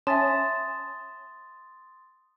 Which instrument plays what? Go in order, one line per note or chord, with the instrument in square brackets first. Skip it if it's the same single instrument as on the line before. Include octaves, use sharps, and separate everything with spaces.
[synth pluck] C#4 [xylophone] E5 G#5 A5 [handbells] C6 D#6 A6